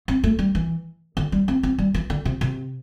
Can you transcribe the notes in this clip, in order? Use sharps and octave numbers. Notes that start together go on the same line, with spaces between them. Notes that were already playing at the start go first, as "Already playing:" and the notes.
C4
A3
G3
E3
D3
G3
C4
C4
G3
E3
D3
C3
C3